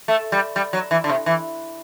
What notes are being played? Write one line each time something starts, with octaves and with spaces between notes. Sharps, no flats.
A3
G3
G3
F#3
E3
D3
C3
E3